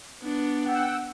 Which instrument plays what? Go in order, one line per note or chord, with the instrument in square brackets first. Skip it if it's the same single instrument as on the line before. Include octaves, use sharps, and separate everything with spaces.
[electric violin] B3 D4
[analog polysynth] F#5 G5 E6